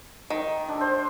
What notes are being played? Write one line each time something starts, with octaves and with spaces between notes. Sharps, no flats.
D#3
D4 A4
C5